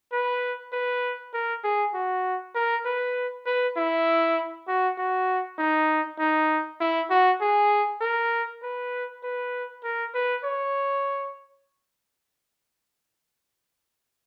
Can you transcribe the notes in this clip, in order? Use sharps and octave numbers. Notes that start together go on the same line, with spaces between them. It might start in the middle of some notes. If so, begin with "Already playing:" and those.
B4
B4
A#4
G#4
F#4
A#4
B4
B4
E4
F#4
F#4
D#4
D#4
E4
F#4
G#4
A#4
B4
B4
A#4
B4
C#5